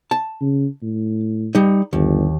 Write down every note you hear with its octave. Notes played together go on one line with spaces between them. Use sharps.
A5
C#3
A2
G3 D#4
G1 D#2